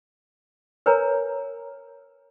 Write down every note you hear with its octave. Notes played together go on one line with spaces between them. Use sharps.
A#4 B4 C#5 G#5 A#5